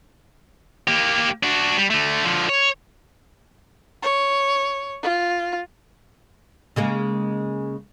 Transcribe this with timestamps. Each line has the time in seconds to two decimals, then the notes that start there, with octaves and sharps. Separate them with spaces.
0.88 A#3 G4
1.43 D4 F#4
1.77 G3
1.90 D3 A3
2.24 D3 F3
2.49 C#5
4.03 C#5
5.03 F4
6.76 C#3 G#3 A#3